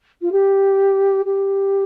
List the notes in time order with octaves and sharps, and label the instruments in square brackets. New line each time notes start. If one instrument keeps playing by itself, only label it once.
[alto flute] F4
G4
G4